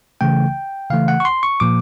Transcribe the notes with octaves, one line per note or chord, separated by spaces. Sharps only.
C#3 E3 A3 G5
C#3 E3 A3 F5
F#5
C#6
C6
C#6
A#2 F3 A#3 D6